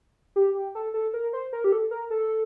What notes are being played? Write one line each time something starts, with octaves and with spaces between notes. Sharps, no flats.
G4
G4
A4
A4
A#4
C5
A#4
G4
A4
A#4
A4